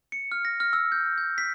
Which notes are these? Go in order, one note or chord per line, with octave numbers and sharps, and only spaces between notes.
C#7
F6
A#6
F6
E6
G6
G6
B6